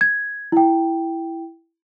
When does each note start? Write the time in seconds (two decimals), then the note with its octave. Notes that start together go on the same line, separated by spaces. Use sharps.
0.01 G#6
0.52 E4 G5